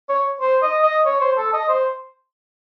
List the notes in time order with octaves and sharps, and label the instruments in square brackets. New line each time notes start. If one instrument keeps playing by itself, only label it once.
[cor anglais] C#5
C5
D#5
D#5
C#5
C5
A4
D#5
C5